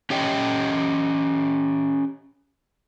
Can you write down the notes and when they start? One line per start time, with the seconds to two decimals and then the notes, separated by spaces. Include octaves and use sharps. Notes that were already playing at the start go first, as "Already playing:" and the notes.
0.10 C#4 G4 C#5 D#5 G5